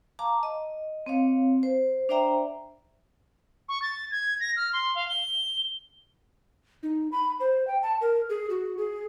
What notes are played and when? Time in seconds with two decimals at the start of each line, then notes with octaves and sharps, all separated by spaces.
0.19 F5 A5 A#5 D6
0.43 D#5
1.06 C4 C#5 F5
1.63 C5
2.09 D4 C5 D5 E5 G5 A#5
3.69 C#6
3.82 A6
4.11 G#6
4.40 A#6
4.57 F6
4.73 C6
4.95 F5
5.08 G7
6.83 D#4
7.12 B5
7.40 C5
7.67 G5
7.82 A5
8.01 A#4
8.30 G#4
8.50 F#4
8.78 G#4